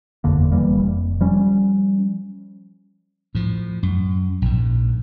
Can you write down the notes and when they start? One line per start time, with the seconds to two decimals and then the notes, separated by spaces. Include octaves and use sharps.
0.24 F#1 E2 D3 A#3
0.52 F1 E3 G3 A#3
0.78 F1
1.21 F3 G3 C#4
3.35 A2 F3
3.83 F#2
4.42 A#1 G#2